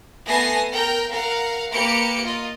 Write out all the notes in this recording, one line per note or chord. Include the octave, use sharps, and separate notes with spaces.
A3 B3 G#5 A5 A#6 C7
A#4 G5
A#4 F5 F#5
A#3 G4 B4 C#7 D7
F4 D#5